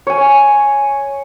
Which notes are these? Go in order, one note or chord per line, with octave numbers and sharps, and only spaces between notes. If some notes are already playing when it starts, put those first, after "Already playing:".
C#5 G#5